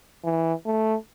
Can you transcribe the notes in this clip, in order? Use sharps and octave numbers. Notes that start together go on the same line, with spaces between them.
E3
A3